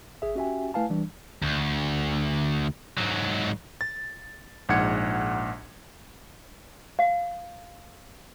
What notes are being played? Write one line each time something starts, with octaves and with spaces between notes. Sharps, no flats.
G#1 G#4 E5
C#4 F#4 G4 E5 G5 G#5
A3 E4 B4 F5 G#5 A5
E3 G3 D4
D2
G#2 F#3
A6
A#1 G#2 F#5 G#6 C#7
F5